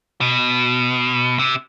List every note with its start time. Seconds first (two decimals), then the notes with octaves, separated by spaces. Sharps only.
0.21 B2
1.39 C3